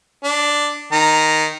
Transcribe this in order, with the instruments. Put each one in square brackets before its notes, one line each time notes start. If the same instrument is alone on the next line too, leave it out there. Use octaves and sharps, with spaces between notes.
[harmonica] D4
D#3 A#5